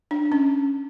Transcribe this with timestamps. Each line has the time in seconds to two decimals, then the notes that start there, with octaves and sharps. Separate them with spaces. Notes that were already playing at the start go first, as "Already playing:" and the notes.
0.11 D4
0.32 C#4